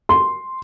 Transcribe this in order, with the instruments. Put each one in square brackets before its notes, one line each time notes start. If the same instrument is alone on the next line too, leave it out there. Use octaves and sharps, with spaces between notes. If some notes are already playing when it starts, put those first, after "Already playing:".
[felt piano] C6